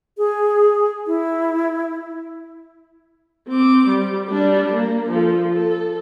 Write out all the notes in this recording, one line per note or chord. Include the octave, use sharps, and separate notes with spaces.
G#4
E4
C4 D6
G3
G3 D4
A#3
F3 A4
A4